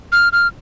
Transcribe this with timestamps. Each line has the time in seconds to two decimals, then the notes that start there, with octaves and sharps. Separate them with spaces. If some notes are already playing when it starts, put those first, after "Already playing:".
0.12 F6
0.33 F6